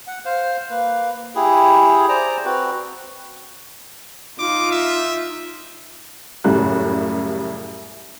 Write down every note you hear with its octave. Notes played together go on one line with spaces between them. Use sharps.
F#5
C5 F5
A#3 B4
E4 G4 G#4
C5 D5 A#5
C4 F#4 B4
D#4 F4 D6
E5
F#2 A2 C#3 G3 F#6